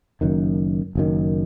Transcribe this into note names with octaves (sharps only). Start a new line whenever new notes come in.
F#1 F#2 D#3
F#1 F#2 D#3